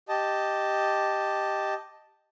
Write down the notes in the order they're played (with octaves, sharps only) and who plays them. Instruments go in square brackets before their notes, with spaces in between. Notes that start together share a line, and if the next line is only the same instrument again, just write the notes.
[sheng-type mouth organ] G4 D#5 A5